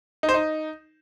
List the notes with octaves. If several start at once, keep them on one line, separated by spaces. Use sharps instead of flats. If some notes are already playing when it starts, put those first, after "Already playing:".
D#4
C5
D#4